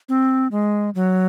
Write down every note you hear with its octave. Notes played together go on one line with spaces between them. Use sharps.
C4
G#3
F#3